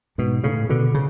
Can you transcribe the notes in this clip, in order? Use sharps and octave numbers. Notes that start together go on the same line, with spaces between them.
G#2 B2
A2 C#3
B2 D3
C#3